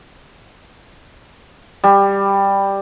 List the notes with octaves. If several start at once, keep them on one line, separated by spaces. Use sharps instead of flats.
G3